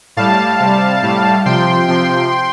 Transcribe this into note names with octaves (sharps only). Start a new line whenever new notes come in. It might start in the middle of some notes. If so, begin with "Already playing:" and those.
A2 G3 F5 A5
C3 G3
A2 G3
C3 F3 G5 C6
C3 F3 G5 C6